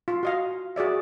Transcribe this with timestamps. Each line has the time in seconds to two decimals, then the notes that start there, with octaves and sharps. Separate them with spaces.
0.08 F4
0.23 F#4 D#5 F5
0.76 F#4 G#4 D5 E5